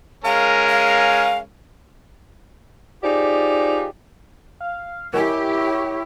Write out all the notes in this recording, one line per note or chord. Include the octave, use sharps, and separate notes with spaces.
G#3 C#4 A#4 F5
F5
D#4 F4 G4 G#4 C5 D5
F5
E4 G4 A#4 C#5 D#5 G#5